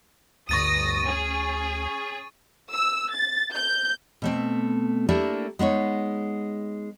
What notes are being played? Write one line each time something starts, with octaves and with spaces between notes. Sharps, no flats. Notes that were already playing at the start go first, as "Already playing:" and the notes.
G1 D2 C#6 D#6 A6 A#6 D#7
C#4 G#4
E6
A6
G6
B2 A3 C4
A3 A#3 D4 E4 G4 A#4
G#3 B3 D#4 C#5